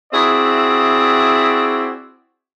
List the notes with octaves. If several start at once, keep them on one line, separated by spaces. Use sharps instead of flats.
C4 E4 F#4 G#4 D5 E5